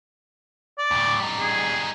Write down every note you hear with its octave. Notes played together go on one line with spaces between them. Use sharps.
D5
D2 A2
G3 D#4
G#4